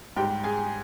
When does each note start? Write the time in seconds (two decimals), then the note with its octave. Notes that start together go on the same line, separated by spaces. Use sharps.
0.17 G#2 G3 G4 G5
0.44 G#4 G#5